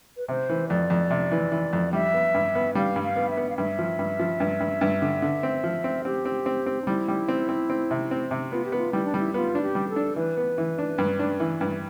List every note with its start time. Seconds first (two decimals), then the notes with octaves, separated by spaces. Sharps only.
0.17 B4
0.28 C3 C5
0.49 E3
0.69 F2 D5
0.90 F2
1.11 C3
1.31 E3
1.52 E3
1.73 F2
1.93 G3 E5
2.14 B3
2.34 G2
2.55 B3
2.75 G3 F5
2.96 G2
3.03 F5
3.16 B3
3.30 E5
3.37 B3
3.49 F5
3.58 G2 E5
3.79 F3
3.99 G2
4.19 F3
4.40 G2
4.60 G2
4.81 G2
5.02 D3
5.22 D3
5.43 C4
5.64 F3
5.84 C4
6.05 C4 G4
6.25 C4
6.46 C4
6.66 C4
6.82 D4
6.87 G3 E4
7.08 G3
7.28 C4
7.49 C4
7.70 C4
7.91 C3
8.11 C4
8.31 C3
8.52 B3 F4
8.65 G4
8.72 B3 F4
8.93 G3 E4
9.05 D4
9.14 G3 E4
9.34 B3 F4
9.55 D4
9.62 G4
9.75 G3
9.89 A4
9.96 D4
10.16 E3 B4
10.37 B3
10.58 E3
10.78 D4
10.98 G2
11.19 D4
11.40 E3
11.61 G2